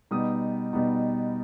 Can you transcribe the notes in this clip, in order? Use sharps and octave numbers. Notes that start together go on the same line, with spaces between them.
B2 G3 B3 D#4 D#6
B2 G3 B3 D#4